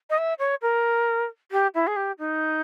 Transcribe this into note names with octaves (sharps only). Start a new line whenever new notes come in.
D#5
E5
C#5
A#4
G4
E4
G#4
G4
D#4